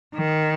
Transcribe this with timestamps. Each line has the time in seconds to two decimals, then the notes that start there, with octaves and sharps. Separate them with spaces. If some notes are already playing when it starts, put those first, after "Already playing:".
0.15 D#3